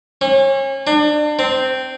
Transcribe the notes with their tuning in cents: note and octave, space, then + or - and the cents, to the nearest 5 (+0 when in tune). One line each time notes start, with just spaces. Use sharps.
C#4 -35
D4 +35
C4 -10